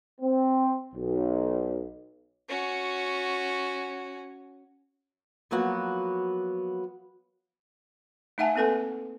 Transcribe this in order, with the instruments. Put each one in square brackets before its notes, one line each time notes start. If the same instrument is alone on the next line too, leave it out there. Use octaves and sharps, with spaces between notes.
[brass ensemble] C4
B1
[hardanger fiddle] C#4 F#4
[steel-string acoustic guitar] F3 F#3 A#3 B3 F#4
[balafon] A3 D#4 E5 F#5 G#5 A5
A#3 C4 A4 B4 G#5